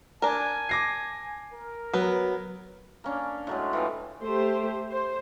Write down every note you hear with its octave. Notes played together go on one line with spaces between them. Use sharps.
D4 A#4 G#5
D6 A#6 C7
A#4
F#3 B3 B4
A#3 C#4 D4
A2 F#3 G#3
E3 F3 C4
A3 G4 C5
C5